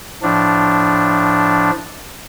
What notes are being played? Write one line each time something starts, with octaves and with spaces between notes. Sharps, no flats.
A2 F3 D4